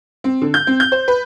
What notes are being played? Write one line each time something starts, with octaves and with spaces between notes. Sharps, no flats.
C4
D3
G6
C4
G6
C5
B4